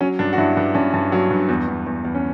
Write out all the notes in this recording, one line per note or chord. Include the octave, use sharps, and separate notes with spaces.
F#3 C#4
G2 D4
F#4
G2 E4
G2
G2 C#4
G2
F#3
G2
E2
E2
E2
E2
C#4